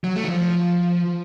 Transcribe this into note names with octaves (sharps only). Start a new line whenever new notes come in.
F#3
A3
D#3
F3